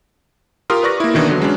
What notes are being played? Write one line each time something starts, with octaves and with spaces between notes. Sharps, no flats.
F4 G4 A#4 C6 D#6 F6
B4 D5 C#6 A#6
A#3 E4
B2 D#3 E3 D4
D3 F#3
F#3 G#3 C#4 D4